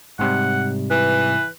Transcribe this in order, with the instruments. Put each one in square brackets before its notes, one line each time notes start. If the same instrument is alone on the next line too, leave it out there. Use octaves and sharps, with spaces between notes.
[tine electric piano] G#2 C3 G3 [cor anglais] F#5
[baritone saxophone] E3 [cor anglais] B4